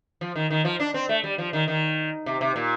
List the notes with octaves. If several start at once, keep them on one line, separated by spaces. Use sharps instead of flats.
F3
D#3
D#3
F3
D4
C4
A3
G3
F3
D#3
D#3
C3
C3
A#2